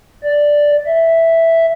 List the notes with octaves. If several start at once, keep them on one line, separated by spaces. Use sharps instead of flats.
D5
E5